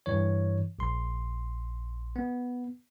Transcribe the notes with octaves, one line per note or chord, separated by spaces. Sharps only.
G2 E3 C#5
A#1 C6
B3